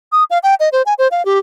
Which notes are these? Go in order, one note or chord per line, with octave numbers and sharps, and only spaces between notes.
D#6
F5
G5
D#5
C5
G#5
C5
F5
G4